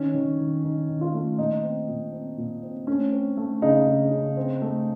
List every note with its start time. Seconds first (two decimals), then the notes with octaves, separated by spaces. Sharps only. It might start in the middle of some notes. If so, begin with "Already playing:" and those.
Already playing: D#3 C#4
0.14 D#3
0.39 D#3
0.64 D#3 D#4
0.89 D#3
1.01 F4
1.14 A3
1.38 A#2 D#4
1.63 C4
1.88 A#2
2.13 C4
2.38 A#2
2.63 C4
2.87 A3 C#4
3.12 C4
3.37 A3
3.62 C#3 D#4
3.87 C#3
4.12 C#3
4.37 C4
4.62 A3